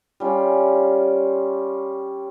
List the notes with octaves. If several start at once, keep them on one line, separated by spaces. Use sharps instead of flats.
G3 C#4 F4